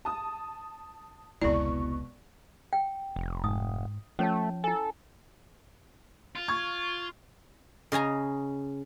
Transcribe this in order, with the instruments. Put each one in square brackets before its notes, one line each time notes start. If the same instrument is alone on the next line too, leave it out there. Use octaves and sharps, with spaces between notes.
[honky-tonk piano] A5 D#6
[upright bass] F1 C#2 [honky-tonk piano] B2 C#6 [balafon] B3 D5 [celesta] E4
[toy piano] G5
[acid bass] F1
[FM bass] G#2 [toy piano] D#6
[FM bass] F3 [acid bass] A3 [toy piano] C#4 C#5 A5
[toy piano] E4 G#5 [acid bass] A4
[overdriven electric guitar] F4
[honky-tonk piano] C#6 G#6
[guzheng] C#3 D#5 G#5 A#5